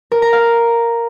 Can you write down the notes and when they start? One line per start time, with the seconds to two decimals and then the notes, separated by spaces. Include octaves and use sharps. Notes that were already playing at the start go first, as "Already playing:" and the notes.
0.12 A#4
0.22 A#5
0.33 F5